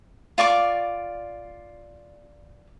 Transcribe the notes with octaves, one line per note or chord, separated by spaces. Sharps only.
F4 D5 C#6 D6